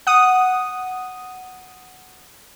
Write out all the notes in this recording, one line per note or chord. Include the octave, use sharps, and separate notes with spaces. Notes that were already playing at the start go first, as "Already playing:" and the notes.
F#5 D#6